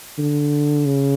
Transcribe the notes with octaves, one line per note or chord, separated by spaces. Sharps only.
D3
C#3